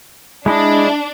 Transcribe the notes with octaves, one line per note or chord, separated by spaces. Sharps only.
G#3 D4 E4 D#5